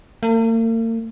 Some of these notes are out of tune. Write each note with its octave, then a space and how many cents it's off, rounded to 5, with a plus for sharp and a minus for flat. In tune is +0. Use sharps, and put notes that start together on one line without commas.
A#3 -45